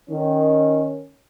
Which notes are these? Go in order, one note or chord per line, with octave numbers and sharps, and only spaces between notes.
D#3 C#4